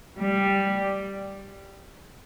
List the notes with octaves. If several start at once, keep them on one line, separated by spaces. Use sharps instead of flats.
G3